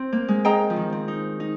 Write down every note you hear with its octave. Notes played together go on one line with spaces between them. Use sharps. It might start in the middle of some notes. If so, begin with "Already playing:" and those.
Already playing: C4
A#3
G#3
G#4 D#5 G5 A#5
F3
D#3
C4
D#4
D#4